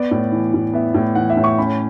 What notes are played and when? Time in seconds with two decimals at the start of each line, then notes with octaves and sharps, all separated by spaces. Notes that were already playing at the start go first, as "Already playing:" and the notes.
Already playing: B3 D5
0.11 A2
0.32 E3
0.54 A2
0.73 B3 E5
0.94 A2
1.15 E3 F#5
1.30 E5
1.37 A2
1.44 C#6
1.58 C#4 B5